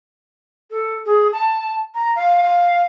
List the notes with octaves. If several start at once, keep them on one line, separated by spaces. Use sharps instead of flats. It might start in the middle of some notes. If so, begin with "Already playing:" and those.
A4
G#4
A5
A#5
F5
F5